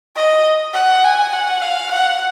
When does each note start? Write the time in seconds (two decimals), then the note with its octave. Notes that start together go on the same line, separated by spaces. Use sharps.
0.16 D#5
0.74 F#5
1.04 G#5
1.32 F#5
1.62 F5
1.90 F#5